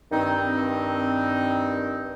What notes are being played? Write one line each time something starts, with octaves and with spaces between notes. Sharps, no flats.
G2 D#3 C4 D#4